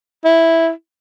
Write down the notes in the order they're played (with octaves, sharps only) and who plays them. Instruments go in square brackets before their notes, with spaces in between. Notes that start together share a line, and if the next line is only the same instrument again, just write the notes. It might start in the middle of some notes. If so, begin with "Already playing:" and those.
[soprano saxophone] E4